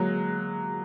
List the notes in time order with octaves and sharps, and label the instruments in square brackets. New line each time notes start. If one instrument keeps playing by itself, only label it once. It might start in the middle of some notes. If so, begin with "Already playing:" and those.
Already playing: [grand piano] F#3 G#3 A#3